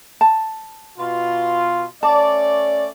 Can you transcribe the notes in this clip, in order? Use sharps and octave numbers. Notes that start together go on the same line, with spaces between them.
A5
B2 F4
A3 C#4 D5 A5